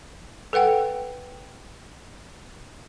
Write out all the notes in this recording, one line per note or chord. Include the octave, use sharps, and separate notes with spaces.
A4 B4 F#5 G5